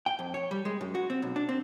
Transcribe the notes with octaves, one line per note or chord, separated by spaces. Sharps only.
G5
F2
C#5
G3
G#3
F#2
F#4
C4
B1
D4
C4